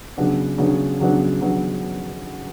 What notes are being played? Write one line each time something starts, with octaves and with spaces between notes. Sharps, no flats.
C#3 F#3 B3 D4
C#3 F#3 B3 D4
C#3 F#3 B3 D4
C#3 F#3 B3 D4